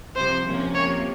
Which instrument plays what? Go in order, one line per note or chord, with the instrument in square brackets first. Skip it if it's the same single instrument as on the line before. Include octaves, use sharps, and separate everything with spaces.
[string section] C2 C3 F3 [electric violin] C5
[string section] C2 C3 F3 A#3 C#4
[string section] C3 F3 A#3 [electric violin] C#5